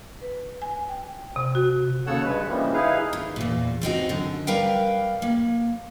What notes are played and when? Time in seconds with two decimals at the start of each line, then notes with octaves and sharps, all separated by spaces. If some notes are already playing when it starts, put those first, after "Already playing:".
0.22 B4
0.62 G#5
0.89 G5
1.36 C3
1.55 F#4
2.07 D#2 C#3 A4 C#5 F#5 E6
2.25 G2 G#3 B4
2.49 C#3 E3 F3 G3 G#3 A#3
2.74 D#4 E4 G#4 B4 F5
3.13 D#2
3.36 E2 A#2
3.82 E2 C4 D#4 F#4
4.09 F#2 D3
4.47 G3 A#4 B4 F5 G5
5.22 A#3